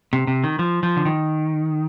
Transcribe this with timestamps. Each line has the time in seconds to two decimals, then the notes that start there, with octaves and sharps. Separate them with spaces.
0.13 C3
0.27 C3
0.44 D#3
0.59 F3
0.83 F3
0.97 D3
1.05 D#3